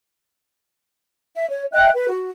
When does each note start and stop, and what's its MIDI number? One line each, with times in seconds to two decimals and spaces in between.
1.34 1.47 76
1.50 1.64 73
1.73 1.89 75
1.73 1.89 76
1.73 1.89 79
1.73 1.89 90
1.94 2.08 71
2.09 2.30 66